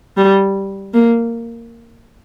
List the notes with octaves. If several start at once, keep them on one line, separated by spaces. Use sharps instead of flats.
G3
A#3